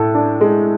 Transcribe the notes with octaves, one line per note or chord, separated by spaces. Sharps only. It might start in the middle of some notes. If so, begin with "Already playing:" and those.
Already playing: A2 A4
D4
G#3